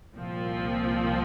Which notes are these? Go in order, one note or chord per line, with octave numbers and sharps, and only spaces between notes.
C2 A#2 F3 C4